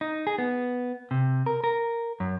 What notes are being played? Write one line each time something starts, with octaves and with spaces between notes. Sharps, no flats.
D#4
G#4
B3
C3
A#4
A#4
F#2